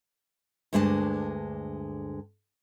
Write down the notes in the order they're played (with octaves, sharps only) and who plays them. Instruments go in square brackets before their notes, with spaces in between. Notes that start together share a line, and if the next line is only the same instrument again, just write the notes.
[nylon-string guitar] D2 G2 G#3 D4 G5 A5